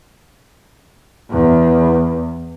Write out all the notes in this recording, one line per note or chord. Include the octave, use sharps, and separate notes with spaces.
E2